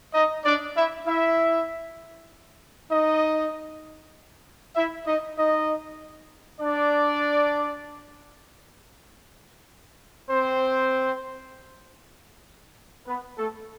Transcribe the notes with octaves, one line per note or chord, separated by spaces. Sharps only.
D#4 D#5
D4 D5
E4 E5
E4 E5
D#4 D#5
E4 E5
D#4 D#5
D#4 D#5
D4 D5
C4 C5
B3 B4
A3 A4